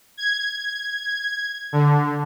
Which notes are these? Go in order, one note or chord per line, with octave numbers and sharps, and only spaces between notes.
G#6
D3